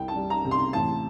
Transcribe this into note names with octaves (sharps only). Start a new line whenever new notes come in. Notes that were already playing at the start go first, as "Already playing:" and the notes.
Already playing: C2 G5
A5
G3
A#5
C3
C6
A1 A5